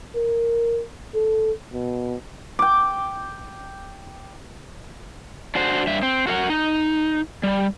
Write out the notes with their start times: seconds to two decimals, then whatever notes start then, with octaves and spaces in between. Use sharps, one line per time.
0.16 A#4
1.15 A4
1.73 B2
2.59 G5 D6
5.55 D4 F#4 C5
5.87 G2 E5
6.03 C4
6.27 F#4 A#4 F5 F#5
6.50 D#4
7.43 G3